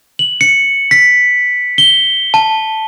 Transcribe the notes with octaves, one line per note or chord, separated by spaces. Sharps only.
F#7
C#7
B6
G7
A5